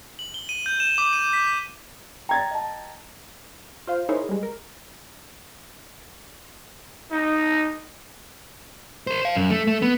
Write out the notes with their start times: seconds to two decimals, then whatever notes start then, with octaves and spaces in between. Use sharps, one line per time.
0.19 F#7
0.34 G7
0.49 D#7
0.66 G6
0.80 E7
0.98 D6
1.13 D#7
1.33 B6
1.47 B6
2.29 G5 A#5 G#6 A6
2.51 D#5 A5
3.87 F4 C5 F5
4.09 D#4 E4 G#4 A#4 C5 C#5
4.29 G3 G#3
4.43 A#4
7.12 D#4
9.07 A#4 C5
9.22 C5 F5
9.35 F#2
9.50 A3
9.67 A3
9.82 B3